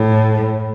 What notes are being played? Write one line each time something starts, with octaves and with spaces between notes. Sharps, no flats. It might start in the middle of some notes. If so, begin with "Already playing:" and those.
Already playing: A2